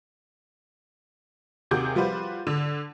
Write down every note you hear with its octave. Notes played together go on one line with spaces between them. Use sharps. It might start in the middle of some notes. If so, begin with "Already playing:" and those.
D#2 C3 F#4 G#4 D6 G6
F3 G3 F4 F#4 B4 C5
D3